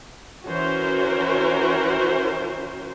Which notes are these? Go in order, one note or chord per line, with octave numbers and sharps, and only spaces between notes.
E3 C#4 F#4 A#4 C5